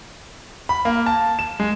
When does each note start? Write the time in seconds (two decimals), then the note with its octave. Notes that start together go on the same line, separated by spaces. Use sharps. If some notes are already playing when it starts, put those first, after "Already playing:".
0.69 B5
0.85 A#3
1.06 A5
1.39 E7
1.60 G#3